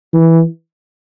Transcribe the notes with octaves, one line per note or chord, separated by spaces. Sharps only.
E3